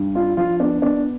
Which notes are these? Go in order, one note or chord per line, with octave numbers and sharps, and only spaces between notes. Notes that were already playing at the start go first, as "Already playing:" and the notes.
Already playing: G2
D4 F4
F3 F4
B3 D4
B3 D4